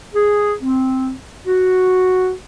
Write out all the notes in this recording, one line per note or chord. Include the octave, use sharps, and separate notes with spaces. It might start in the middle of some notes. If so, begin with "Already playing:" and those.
G#4
C4
F#4